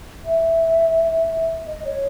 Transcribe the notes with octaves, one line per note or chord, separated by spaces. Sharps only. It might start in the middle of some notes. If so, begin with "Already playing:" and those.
E5
D#5
C#5